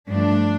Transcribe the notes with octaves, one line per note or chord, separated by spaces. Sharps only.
G2 F3 A3 D4